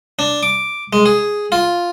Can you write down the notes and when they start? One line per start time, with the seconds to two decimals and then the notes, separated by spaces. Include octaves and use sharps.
0.19 D4
0.43 D6
0.93 G#3
1.06 G#4
1.52 F4